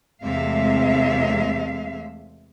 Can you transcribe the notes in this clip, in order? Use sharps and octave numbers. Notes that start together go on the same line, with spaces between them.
E2 C3 G#3 A3 E5 F5